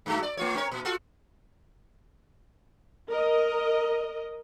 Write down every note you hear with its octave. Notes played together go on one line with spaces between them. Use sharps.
G2 A3 F#4
D5
A3 F4 C#5
C4 A#4 C#5
A#2
F4 F#4 A4
A#4 D#5